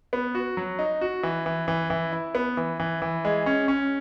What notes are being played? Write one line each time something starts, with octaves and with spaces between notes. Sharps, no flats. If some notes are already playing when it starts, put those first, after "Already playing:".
B3
F#4
F#3
D#4
F#4
E3
E3
E3
E3
E4
B3
E3
E3
E3
G#3
C#4
C#4